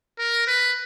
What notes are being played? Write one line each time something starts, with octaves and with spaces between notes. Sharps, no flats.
A#4
B4